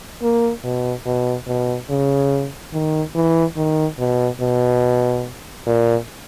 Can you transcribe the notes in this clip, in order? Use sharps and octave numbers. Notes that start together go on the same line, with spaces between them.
A#3
B2
B2
B2
C#3
D#3
E3
D#3
B2
B2
A#2